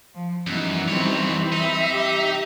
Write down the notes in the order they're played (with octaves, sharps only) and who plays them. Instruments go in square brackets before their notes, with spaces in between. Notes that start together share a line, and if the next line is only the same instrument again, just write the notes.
[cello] F3
[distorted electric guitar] F#2 [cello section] E3 G3 [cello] B3 D#4
[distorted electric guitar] F2 C#5 [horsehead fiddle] C4 B5 [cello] D#4
[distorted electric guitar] D#4 [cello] E5
[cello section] G4